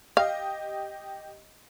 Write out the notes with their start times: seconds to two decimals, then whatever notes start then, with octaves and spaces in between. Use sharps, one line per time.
0.17 G4 D#5 F5